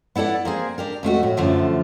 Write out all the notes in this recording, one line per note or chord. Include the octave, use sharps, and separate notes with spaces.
B3 E4 A4 D5 F#5
A#3 C4 G#4
D4 G4 A#4
F2 A3 F4 F#4
A2
F#2 D3 F3 A3